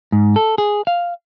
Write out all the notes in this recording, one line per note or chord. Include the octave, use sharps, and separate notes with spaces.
G#2
A4
G#4
F5